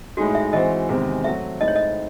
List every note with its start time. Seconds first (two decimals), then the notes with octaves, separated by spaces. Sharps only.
0.17 A2 G#3 D#4 F#4 G#4
0.35 E5
0.53 E3 G#3 C4 F#4 C5 D#5
0.89 E2 C3 D#3 G#3 C4
1.24 F#3 A3 C4 F#4 E5
1.61 A2 G#3 C4 D#4 D#5
1.68 C#5
1.76 D#5